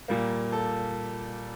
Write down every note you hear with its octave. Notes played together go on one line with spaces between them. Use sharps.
A#2 G3 A#3
A4